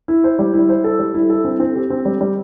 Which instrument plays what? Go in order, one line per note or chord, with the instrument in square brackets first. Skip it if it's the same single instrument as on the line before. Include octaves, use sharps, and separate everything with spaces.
[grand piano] E4
C5
G3
E4
C5
A4
G3
E4
A4
C4
C4
G4
C4
G3
G3